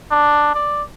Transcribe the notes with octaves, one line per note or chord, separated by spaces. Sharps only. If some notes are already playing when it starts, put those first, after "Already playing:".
D4
D5